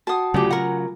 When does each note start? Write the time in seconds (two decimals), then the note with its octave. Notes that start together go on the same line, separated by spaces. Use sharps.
0.07 F#4 F#5 G5 A5 D#6
0.34 D2 C#3 F#3 F4 G4 G#5
0.51 A#4 F#5 A#5